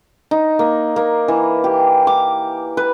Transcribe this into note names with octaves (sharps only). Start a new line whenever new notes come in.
D#4
A#3
A#3
E3
G4
D6
B4